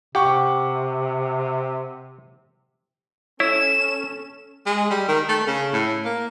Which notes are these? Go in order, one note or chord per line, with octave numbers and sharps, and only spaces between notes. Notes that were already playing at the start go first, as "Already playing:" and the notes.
C3 G4 F#5 C#6
C#4 E4 A4 C#5 E7
G#3
G3
D#3
A3
C#3
A2
A#3